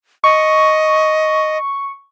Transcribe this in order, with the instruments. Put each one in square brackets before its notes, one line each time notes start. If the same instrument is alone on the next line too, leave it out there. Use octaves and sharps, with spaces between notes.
[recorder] D#5 [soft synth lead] C#6